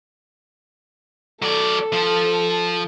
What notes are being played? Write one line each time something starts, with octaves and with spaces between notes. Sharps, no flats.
F#3 A4 D5
F3